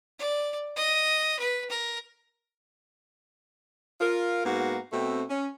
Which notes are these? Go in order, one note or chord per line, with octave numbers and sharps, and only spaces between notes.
D5
D#5
B4
A#4
F4 A#4
G#2 A#3 B3 F#4
B2 A3 C4
C#4